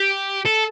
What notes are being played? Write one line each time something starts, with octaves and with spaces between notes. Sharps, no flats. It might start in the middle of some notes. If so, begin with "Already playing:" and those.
Already playing: G4
A4